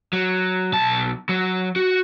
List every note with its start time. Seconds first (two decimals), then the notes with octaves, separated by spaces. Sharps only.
0.13 F#3
0.73 B1 A5
1.29 F#3
1.76 F#4